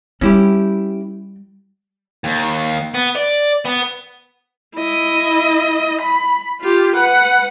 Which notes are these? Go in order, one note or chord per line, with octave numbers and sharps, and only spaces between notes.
G3 C#4 E4 G4
D#2
B3
D5
B3
E4 D#5
B5
F4 G4
B4 F#5